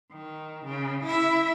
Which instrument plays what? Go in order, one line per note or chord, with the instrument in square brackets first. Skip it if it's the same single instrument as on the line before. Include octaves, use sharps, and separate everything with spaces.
[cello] D#3
C#3
E4 E5